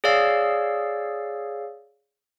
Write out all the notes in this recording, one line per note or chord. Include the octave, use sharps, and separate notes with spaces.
G#4 C#5 D5 F5 E6